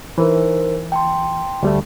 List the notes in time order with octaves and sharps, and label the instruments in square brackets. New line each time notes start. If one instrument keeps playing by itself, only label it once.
[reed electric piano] E3 [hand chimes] D#4 A#4 C5
[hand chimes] G5 A5 C6
[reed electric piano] D2 G3 A3